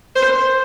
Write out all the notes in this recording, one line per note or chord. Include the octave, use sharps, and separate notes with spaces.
C5